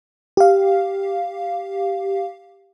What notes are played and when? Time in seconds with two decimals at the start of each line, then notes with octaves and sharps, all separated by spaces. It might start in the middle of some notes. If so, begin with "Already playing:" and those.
0.37 G4 F5